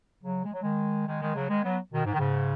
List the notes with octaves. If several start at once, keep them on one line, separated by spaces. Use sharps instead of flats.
C#3 F#3
G#3
F#3
D#3 G#3
D#3 G#3
D#3 G#3
C#3 F#3
D#3 G#3
F#3 B3
B2 D#3
G#2
D#3
G#2 C#3